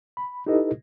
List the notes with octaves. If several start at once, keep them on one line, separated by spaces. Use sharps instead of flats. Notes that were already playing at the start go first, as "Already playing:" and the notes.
B5
D#4 E4 G4 A4 B4 D#5